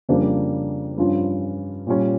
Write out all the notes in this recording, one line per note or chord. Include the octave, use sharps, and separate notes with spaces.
F2 C#3 G3 A#3 D4
G2 F3 C#4 F4
A#2 G3 C#4